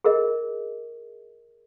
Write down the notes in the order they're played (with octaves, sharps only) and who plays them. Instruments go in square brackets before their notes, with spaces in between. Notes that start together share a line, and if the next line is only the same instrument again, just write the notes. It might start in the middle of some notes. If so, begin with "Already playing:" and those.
[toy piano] G#4 A#4 D#5